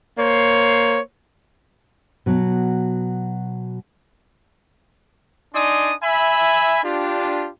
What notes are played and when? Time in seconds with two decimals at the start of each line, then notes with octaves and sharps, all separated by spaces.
0.18 A#3 C5 C#5
2.26 B2 F#3
5.54 D4 D#4 D5 G#5 C6 D#6
6.03 E5 G#5 B5
6.84 D4 F4 G4